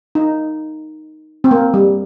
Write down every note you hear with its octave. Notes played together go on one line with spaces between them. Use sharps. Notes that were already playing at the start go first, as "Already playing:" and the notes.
D#4
C4
A#3
G3